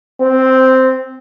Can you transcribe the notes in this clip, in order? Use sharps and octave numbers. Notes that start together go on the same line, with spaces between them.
C4